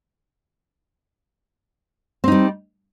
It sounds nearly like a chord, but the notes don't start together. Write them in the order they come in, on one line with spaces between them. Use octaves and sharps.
C4 D#4 G3